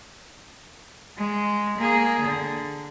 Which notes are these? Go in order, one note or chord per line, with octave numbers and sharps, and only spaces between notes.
G#3
A#3 G#4
D3